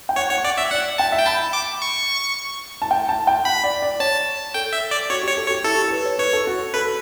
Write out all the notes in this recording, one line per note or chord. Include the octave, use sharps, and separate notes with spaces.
G5
C#5 F#5
C#5 F#5
D5 F#5
E5 F#5
D5 F#5
G5 A5
E5
G5
A5 B5
D6
C#6
A5
G5
A5
G5
F#5 B5
D5
D5
C#5 A5
A4 G5
E5
D5
F#4 C#5
G4 C#5
A4
C#5
G4
E4 A4
G4
A4
B4
C#5
B4 C#5
A4
F#4
A4 B4